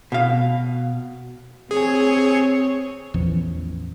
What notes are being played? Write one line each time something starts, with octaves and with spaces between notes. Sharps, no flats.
B2 F5
C4 G#4 C#5
A1 E2 E3 F3